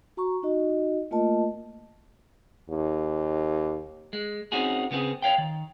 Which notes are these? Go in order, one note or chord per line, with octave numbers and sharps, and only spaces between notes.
F#4 A#5 C#6
D#4 F#4 D#5
A3 A#3 F4 A#4 D#5 A5
D#2
G#3
C4 C#4 D#4 F#4 G#4
C#3 B3 C4 F4 G#4
C#5 F5 G5
D#3